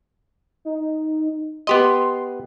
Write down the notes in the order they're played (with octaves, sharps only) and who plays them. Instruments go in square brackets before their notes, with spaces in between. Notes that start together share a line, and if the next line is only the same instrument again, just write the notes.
[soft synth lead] D#4
[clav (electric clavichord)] B3 G4 D#5 [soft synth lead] C6